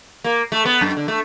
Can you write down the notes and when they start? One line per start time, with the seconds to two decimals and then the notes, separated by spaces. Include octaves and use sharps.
0.24 A#3
0.52 A3
0.65 B3
0.81 F#2
0.97 D3
1.08 A3